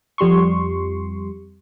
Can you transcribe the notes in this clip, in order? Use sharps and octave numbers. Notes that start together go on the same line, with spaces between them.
F2 G3 C6 C#6